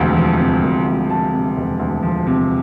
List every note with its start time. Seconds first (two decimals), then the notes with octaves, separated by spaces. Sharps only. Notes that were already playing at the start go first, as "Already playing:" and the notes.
Already playing: E1 D2 C3 F3
0.17 F3
0.40 C3
0.63 E1
0.87 D2
1.10 F3 A5
1.34 C3
1.57 E1
1.80 D2
2.03 F3
2.27 C3